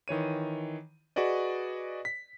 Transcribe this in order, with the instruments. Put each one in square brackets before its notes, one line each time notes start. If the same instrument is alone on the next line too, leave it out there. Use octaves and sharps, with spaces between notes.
[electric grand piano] D#3 E3 C#5 D#7
F#4 G#4 B4 D5 D#5
B6